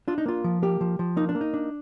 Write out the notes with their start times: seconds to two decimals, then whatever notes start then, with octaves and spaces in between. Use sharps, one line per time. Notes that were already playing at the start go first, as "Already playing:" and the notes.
0.08 D4 F4
0.18 D#4
0.26 A#3 F4
0.44 F3
0.62 A#3 G4
0.81 F3
0.99 F3
1.16 A#3 D#4
1.29 D4
1.35 A#3
1.41 D#4
1.54 D4